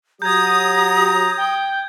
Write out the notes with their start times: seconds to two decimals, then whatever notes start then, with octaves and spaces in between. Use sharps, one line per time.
0.22 F#3 G4 A#5 D#6 G6 G#6
1.37 G5